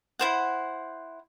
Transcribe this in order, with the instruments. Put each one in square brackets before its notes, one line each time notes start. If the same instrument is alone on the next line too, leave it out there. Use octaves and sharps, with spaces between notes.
[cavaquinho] E4 C5 F#5